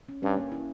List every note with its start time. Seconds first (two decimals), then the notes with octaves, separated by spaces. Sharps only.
0.09 C#4
0.23 G2 C#4
0.37 A#3
0.52 E4